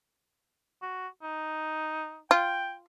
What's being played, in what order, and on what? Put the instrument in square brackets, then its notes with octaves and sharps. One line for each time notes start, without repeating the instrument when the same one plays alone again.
[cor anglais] F#4
D#4
[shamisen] F4 [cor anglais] G5